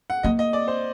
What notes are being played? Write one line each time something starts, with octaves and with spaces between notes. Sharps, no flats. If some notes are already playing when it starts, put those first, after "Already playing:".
F#5
A#3 D#5
D#5
D5
C5